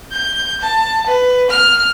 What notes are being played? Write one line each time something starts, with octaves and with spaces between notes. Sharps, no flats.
G6
A5
B4
F6